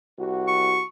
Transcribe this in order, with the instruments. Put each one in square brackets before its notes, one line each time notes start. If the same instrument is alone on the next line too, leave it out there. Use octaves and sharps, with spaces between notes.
[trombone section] C2 F#4
[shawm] C#6